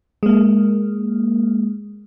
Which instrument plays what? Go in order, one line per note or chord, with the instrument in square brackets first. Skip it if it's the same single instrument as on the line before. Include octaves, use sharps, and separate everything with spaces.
[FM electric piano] G#3 A#3